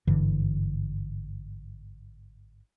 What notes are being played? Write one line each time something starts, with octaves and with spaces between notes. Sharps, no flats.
G#1 G2 D3 E3